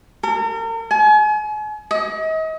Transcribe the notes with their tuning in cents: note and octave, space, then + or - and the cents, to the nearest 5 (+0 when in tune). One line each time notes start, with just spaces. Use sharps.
A#4 -40
G#5 +40
D#5 +35